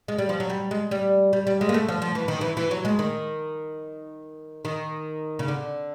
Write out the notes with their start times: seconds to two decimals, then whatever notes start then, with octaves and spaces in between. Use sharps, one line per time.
0.08 G#3
0.18 G3
0.29 F3
0.40 F#3
0.50 G3
0.71 G#3
0.91 G3
1.33 G3
1.47 G3
1.61 G#3
1.69 A#3
1.74 A3
1.88 F3
2.02 F3
2.15 E3
2.28 D#3
2.41 E3
2.57 E3
2.71 F#3
2.85 G#3
2.99 D#3
4.65 D#3
5.39 C#3
5.48 D3